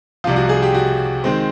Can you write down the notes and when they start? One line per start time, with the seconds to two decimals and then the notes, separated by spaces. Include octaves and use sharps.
0.24 C2 C3 F3 F4
0.36 F#4
0.49 G#4
0.62 G4
0.75 F#4
1.24 D#3 G#3 C4